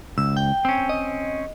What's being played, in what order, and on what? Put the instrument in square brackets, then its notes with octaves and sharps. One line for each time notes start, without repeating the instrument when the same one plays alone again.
[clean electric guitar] C#2 [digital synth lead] E6
[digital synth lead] G5
[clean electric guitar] C4 C#4
[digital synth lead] D#5